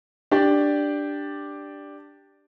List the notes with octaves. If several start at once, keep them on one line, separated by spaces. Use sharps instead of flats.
D4 G4 D5